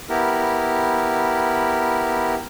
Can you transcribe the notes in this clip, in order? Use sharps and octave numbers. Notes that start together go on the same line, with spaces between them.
B3 E4 G4 A#4